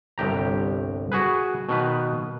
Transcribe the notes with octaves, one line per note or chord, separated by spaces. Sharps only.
G1 C2 G4 A#5
F#4 G#4 B4
B2 D#3 B4